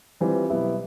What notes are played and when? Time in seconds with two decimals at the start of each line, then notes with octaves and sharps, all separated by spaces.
0.21 E3 G3 C4 F4
0.49 B2 F#3 B3 E4 G4